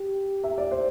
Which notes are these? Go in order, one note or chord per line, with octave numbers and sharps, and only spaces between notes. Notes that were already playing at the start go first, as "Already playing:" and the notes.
Already playing: G4
E5
D5
C5